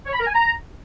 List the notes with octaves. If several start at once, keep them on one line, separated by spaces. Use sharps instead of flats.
C#5
B5
A#4
G#5
A#5